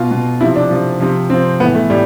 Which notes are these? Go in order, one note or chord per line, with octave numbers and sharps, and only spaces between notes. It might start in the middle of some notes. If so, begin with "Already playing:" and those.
Already playing: B2 F4
B2
C3 F3 E4
D4
C3 F3
C3 F3
C3 F3 C4
A2 E3 B3
A3
A2 G3